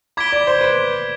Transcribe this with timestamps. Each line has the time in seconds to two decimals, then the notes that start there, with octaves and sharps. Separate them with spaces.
0.17 B5 D6 G#6 B6 D7 G7
0.32 D5
0.47 C5
0.61 B4